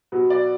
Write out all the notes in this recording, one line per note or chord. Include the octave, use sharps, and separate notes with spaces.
B2 F#3 B3
D5